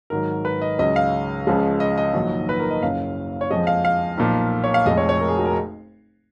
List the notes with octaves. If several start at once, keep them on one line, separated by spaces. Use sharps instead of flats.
G#1 G#2 F#3 A#4
B4
D#5
C#2 C#3 F#3 D#5
F5
C#2 C#3 F3 G#3
D#5
D#5
A#1 G#2 D#3 F#3
B4
A#4
D#5
F#1 F#2 C#3 F5
C#5
F2 F3 G#3 D#5
F5
F5
B1 A#2 F3
C#5
F5
F1 F2 F3 G#3 D#5
C#5
C#5
A#4
G#4
F#4
A#4